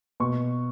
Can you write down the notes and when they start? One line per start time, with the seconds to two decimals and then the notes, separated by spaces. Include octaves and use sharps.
0.20 B2 C#6